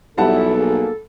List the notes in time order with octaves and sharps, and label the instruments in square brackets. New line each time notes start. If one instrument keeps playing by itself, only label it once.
[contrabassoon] B1 [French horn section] E2 E4 [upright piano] G3 F#5 A5 [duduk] A4
[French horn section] A#3 G#4